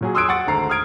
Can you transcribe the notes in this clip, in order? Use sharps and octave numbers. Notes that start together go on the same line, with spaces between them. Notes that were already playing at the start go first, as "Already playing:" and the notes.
A#2 F#3 G#4
C6 D#6 E6 F#6 G#6 D7
F#5 C#6 A6
G#1 D2 A#5 C7
D#6 F6 G#6 D7